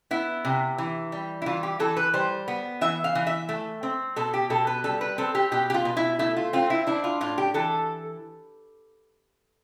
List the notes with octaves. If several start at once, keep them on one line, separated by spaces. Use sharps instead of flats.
B3 E4
C3
E3
G3
E4
E3 F4
G4
E3 A4
B4
G3 C5
B3
E3 E5
F5
E3
E5
A3
C4
B2 A4
G4
B2 A4
B4
G3 A4
B4
C4 A4
G4
B2 G4
G4
F4
B2
E4
A3 E4
F4
C4 F4
E4
D4 E4
F4
A2 F4
G4
E3 A4